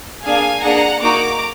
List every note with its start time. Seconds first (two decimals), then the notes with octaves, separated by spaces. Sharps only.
0.24 A#3 D4 G#4 F5 G#5
0.63 A#3 D4 G#4 F#5 A#5
1.01 A#3 D#4 F#4 A#5 D6